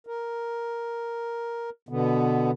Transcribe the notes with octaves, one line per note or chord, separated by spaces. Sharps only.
A#4
B2 D3 B3